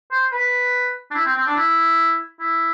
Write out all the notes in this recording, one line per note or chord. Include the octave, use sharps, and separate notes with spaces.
C5
B4
D4
E4
C4
C4
D4
E4
E4